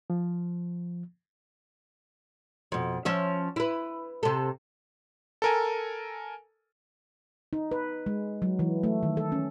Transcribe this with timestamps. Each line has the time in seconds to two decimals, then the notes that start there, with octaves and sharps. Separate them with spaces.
0.10 F3
2.72 F2 B2
3.05 F3 C#4 E5
3.56 E4 B4
4.23 C3 A4
5.42 A4 A#4 G#5
7.53 D#4
7.71 B4
8.06 G#3
8.42 F#3
8.59 E3
8.83 A3
9.03 D#3
9.17 A4
9.32 C#4